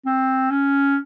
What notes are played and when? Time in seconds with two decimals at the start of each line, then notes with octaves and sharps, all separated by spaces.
0.06 C4
0.50 C#4